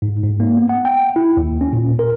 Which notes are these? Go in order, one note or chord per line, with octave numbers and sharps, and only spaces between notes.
G#2
G#2
A#3
B3
F#5
G5
E4
D#2
C#4
A#2
A#4